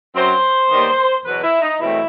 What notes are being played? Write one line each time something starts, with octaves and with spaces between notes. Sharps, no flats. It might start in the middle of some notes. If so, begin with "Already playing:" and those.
F#2 F#3 C4 C5
D#2 D#3 G3 B3
E2 B2 F#3 B4
E4
D#4
E2 B2 F#3 A3 C4 E4